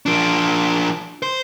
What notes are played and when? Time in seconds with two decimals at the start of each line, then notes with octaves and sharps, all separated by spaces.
0.06 F3 D4
1.22 C5